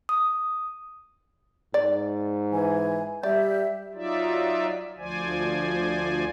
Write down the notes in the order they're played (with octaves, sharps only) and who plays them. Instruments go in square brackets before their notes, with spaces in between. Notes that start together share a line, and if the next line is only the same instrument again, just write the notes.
[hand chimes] D#6
[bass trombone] G#2 [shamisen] D5
[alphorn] E3 [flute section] G#5
[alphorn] G3 [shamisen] D5 [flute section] E5 G6
[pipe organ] F#3 D#4 F4 D5 E5
D2 F3 C5 D5 G#5